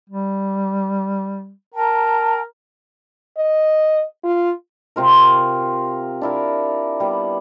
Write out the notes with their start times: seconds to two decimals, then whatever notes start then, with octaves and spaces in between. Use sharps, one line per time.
0.09 G3
1.74 A#4 G5 A5 A#5
3.37 D#5
4.24 F4
4.96 C3 F4 A#4
6.21 D4 E4 A#4
7.00 G3 B3